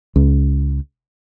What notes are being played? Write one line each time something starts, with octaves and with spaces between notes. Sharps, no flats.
C#2